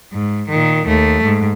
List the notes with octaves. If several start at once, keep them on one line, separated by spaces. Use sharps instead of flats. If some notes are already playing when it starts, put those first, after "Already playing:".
G#2
A#2 D#3
D#2 A3
G#2